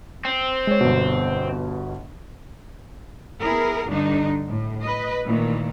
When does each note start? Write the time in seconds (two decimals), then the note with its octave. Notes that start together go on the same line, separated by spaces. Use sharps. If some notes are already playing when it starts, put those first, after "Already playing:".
0.25 C4
0.67 G#3 C#5
0.81 G1 B2
3.42 B3 E4 G#4 A#4
3.87 G2 D3 D4 D#4
4.48 A2
4.83 B4 D#5
5.25 A#2 D#3 E3 A3